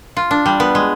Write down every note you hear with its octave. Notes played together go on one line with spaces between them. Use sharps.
F4
D4
G3
B3
G#3